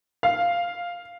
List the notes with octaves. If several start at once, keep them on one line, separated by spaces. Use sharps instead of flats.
F5